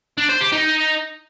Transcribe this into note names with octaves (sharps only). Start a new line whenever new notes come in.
D4
C5
G4
D#4